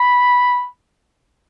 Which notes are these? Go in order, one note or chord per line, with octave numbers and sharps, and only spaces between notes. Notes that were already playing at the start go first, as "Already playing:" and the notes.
Already playing: B5